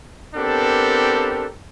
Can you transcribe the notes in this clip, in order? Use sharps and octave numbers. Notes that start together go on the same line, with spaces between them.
B3 C4 D4 G4 A4 A#4